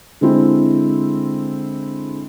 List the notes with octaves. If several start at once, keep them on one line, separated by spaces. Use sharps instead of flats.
D3 G#3 C4 E4